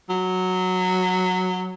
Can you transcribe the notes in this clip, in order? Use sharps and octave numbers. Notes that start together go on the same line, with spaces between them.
F#3